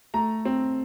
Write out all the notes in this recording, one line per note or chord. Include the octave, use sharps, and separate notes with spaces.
A3 A#5
C4